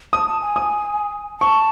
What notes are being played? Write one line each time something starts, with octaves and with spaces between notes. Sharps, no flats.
A5 D#6
A5
G#5
D#6
A5 C#6